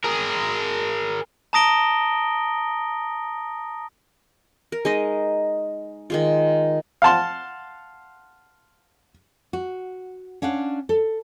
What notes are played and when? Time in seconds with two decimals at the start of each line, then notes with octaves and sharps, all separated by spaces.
0.04 G#4 A#4
1.53 A5 A#5 D#6 A#6 D7 G7
4.72 A#4
4.85 G#3 D#4 D#5
6.10 D#3 G#3 F4
7.02 F5 F#5 A5 C6
9.53 F#4
10.42 C#4 D4 F5 F#5
10.89 A4